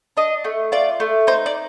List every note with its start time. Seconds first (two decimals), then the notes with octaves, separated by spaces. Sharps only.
0.17 D4 D#5
0.44 A3
0.72 F4 D5
1.00 A3
1.27 D#4 C5
1.46 D5